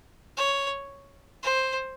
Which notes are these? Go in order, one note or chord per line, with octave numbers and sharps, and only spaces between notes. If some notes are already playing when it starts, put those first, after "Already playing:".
C#5
C5